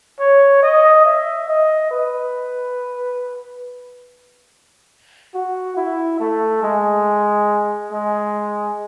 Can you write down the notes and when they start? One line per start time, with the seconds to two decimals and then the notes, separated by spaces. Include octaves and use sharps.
0.19 C#5
0.63 D#5
1.05 E5
1.48 D#5
1.91 B4
5.34 F#4
5.77 E4
6.20 A3
6.63 G#3
7.92 G#3